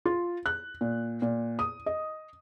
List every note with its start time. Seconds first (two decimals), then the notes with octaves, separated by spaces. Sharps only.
0.06 F4
0.46 F#6
0.81 A#2
1.22 A#2
1.59 D#6
1.86 D#5